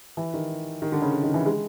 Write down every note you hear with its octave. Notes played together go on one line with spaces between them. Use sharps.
E3
D#3
D#3
D3
C#3
D3
D#3
E3
G#3